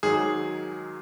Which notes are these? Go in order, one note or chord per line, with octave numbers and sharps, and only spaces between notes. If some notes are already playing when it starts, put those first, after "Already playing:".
G#2 D#3 F#3 G#4